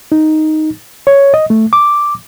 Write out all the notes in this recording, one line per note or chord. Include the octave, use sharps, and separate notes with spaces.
D#4
C#5
D#5
A3
D6